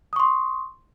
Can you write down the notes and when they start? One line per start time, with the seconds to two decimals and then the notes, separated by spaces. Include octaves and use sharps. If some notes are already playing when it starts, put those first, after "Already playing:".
0.13 D#6
0.16 C#6
0.20 C6